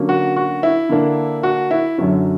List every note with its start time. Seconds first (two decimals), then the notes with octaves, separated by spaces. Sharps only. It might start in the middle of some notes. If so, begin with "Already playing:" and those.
Already playing: D3 F#3 A#3 C#4
0.09 F#4
0.36 F#4
0.63 E4
0.89 D3 A#3 D4
1.43 F#4
1.71 E4
1.98 F#2 D3 F#3 C#4